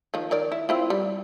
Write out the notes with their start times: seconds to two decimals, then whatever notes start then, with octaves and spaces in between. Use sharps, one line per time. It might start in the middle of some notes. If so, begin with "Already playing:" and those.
0.14 D#3 F3
0.31 D#3 A#4 D5
0.52 E4
0.69 C4 E4 F4
0.90 G3